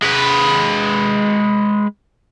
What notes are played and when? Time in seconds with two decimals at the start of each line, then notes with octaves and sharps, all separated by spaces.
0.02 G#3 B4